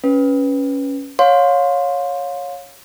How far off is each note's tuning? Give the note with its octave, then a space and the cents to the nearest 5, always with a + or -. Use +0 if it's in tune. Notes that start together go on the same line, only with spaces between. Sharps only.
C#4 +0 B4 +0
C#5 +0 F5 +25 C6 +0